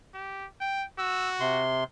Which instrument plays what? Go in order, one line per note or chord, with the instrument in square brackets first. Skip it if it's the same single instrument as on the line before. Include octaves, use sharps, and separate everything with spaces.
[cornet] G4
G5
[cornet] F#4 [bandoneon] E6
[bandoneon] C3 C6